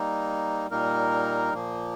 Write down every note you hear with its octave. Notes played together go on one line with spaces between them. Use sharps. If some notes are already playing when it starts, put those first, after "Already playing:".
Already playing: G3 A#3 D#4
A#2 G3 A#3 D#4 A#4
A#2 F3 A#3